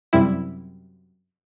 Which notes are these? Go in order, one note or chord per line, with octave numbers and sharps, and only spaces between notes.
F#2 C3 G3 E4